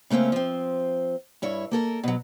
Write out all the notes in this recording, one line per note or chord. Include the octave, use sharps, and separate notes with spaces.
C#3 A3 A#3 C4 C#4
F3 C4
G2 E4 C#5
A#3 A4 A#4
B2 F#3